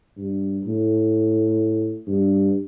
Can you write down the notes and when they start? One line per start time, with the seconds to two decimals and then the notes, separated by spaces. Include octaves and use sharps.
0.17 G2
0.65 A2
2.07 G2